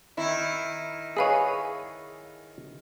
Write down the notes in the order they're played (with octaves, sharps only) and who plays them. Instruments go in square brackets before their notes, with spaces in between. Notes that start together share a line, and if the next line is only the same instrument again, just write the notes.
[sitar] D#3 E4
[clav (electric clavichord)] G#4 B4 C#5 [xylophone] D#5 F5 G#5